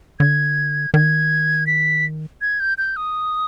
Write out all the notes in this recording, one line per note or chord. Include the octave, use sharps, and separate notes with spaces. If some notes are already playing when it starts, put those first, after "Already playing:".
D3 G#6
D#3 G#6
B6
G#6
G6
G6
D#6